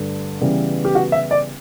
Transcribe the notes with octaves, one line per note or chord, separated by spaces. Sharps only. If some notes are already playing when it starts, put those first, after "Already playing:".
Already playing: G2 D3 A3
C#3 E3 G3 B3
G4
F#4
E5
D5